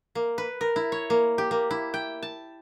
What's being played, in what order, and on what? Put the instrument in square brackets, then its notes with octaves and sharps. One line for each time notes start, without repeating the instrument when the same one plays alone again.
[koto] A#3
B4
A#4
E4
C#5
A#3
G4
A#3
E4
G5
A5